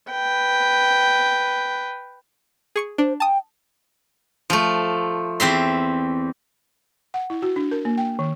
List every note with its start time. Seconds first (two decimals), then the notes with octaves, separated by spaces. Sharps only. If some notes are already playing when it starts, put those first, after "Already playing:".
0.11 B4 G5
2.76 G#4 C#6 C#7
2.98 D4 C5
3.20 G5 A5 D#6
4.50 F3 A3
5.40 E2 C4 E5 C6
7.14 F#5
7.30 E4
7.42 F#4
7.56 D4
7.71 A#4
7.85 A#3
7.98 G5
8.19 D#3